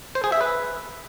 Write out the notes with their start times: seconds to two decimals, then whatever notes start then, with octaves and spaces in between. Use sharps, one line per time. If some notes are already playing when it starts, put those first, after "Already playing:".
0.15 C5
0.24 G#4
0.32 E5
0.41 B4